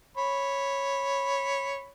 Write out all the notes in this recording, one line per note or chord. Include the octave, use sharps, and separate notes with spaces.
C#5 B5